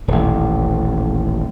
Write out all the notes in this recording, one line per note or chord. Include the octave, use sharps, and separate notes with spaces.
D#1 A1